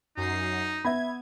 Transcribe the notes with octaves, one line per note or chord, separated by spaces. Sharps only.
F#2 D#4 C7
B3 E5 B5 G#6